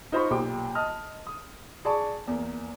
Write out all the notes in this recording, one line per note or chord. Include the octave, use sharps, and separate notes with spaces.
D#4 F4 C5 D#5 B5 C#6
B1 A#2 G4 G5 D6
D#5 A5 D#6 F6
D#6
G#4 D5 A5 C#6
E2 A#3